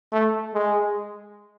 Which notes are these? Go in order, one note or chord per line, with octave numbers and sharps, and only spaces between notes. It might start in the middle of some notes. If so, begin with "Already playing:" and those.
A3
G#3